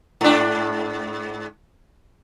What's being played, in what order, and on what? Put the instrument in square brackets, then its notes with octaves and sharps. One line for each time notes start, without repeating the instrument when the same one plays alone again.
[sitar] G#2 D4